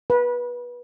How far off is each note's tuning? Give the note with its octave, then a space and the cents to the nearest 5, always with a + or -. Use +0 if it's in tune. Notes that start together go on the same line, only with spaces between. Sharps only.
B4 -20